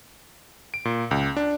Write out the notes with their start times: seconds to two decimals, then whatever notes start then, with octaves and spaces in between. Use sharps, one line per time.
0.74 D7
0.85 A#2
1.11 C#2
1.37 D4